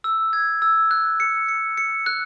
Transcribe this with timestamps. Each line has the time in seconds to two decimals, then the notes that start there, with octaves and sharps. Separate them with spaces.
0.04 E6
0.33 G#6
0.62 E6
0.91 F#6
1.20 C#7
1.48 C#7
1.77 C#7
2.06 F#6